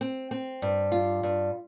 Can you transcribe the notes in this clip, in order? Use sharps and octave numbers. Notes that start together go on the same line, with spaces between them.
C4
C4
G2
F4
G2